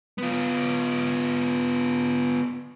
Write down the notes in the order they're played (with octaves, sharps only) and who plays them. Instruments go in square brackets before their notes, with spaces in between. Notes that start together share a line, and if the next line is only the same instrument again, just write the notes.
[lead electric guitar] B3 F4